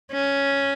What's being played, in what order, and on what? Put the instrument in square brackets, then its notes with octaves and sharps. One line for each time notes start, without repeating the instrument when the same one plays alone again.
[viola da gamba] C#4